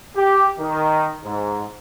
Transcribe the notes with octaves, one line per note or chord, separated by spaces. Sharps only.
G4
D#3
G#2